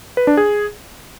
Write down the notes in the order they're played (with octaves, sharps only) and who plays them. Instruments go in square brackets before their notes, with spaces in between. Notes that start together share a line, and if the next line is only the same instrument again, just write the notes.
[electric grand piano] B4
D4
G#4